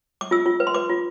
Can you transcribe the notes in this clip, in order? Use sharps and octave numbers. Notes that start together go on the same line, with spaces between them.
D6
F4 E6
F4
B4
C6
B4 D6
F4